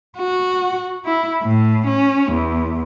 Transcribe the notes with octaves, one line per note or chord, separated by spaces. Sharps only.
F#4
E4
A2
C#4
E2